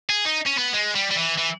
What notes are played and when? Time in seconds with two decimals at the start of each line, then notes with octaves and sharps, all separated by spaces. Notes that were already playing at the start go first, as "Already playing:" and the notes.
0.10 G#4
0.25 D#4
0.46 C#4
0.57 B3
0.73 G#3
0.95 G3
1.11 G3
1.16 E3
1.38 E3